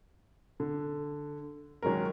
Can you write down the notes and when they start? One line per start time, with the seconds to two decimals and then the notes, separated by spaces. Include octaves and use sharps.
0.60 D3
1.82 D#3 F#3 G#3 C#4 A#4